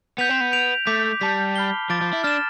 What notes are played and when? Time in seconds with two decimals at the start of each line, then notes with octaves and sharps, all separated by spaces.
0.18 B3 G6 B6 F7
0.29 C4
0.41 B3
0.52 G6 D7 F7
0.86 A3 D6 G6 B6
1.21 G3 A5 D6 G6 B6
1.56 B5 F6 C7 G7
1.90 F3 D6 A6 D7 G7
2.01 F3
2.13 E4
2.24 D4 F6 A6 E7